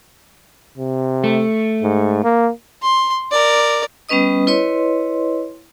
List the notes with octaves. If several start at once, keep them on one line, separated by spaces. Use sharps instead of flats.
C3
A3
G#2
A#3
C6
A#4 D5
G3 B3 C#4 B4 D#5 D#6
E4 B4 C#5 D#5 C6